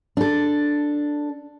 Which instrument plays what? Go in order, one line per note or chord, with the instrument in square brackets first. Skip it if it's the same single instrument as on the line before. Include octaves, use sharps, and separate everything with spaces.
[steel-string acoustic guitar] D4 A4